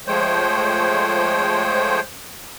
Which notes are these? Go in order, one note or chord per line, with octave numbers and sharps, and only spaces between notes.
F3 G#3 A3 C5 C#5 G5